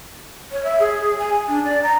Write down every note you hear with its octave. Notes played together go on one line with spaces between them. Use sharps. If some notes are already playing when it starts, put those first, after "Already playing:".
C#5
E5
G#4
G#5
D4
D5
A#5